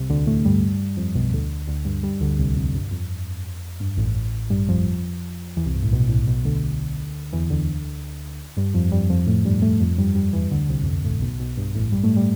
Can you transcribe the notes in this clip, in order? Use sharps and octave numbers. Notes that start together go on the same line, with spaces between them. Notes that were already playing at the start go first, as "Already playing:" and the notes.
Already playing: C2 C3
D2 D3
A2 A3
G2 G3
F2 F3
B1 B2
D2 D3
D2 D3
G2 G3
G2 G3
D2 D3
C2 C3
F2
G2
F2
G2
A1 A2
G2 G3
F2 F3
E2 E3
C2 C3
G2
A1 A2
B1 B2
A1 A2
B1 B2
D2 D3
E2 E3
D2 D3
G2 G3
F2 F3
G2 G3
F2 F3
A2 A3
G2 G3
A2 A3
F2 F3
G2 G3
G2 G3
E2 E3
D2 D3
C2 C3
F2
G2
A1 A2
B1 B2
B1 B2
G2
A1 A2
G2 G3
A2 A3
G3